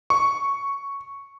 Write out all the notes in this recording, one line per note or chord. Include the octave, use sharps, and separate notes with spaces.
C#6